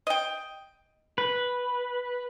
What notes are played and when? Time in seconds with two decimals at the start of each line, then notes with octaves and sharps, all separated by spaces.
0.07 D#5 G5
1.18 B4